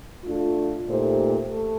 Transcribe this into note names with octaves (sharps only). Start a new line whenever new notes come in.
A3 D4 F4
A#2 A3 D#4 G4 C5
A3